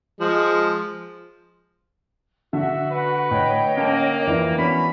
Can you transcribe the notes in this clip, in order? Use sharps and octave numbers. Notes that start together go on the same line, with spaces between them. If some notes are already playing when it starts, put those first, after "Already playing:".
F3 G#3
D3 F#4 E5
B4
A2 C#5 D#5 G5
A#3 C#4 A5
F2 E3 D4
B3 C#4 D4 F#4 B5